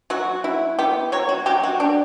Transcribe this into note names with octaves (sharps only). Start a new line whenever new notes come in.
F#3 F#4
E4
B3 G4
F#3 C#5
F#4
F#3 G4
F#4
D4 G4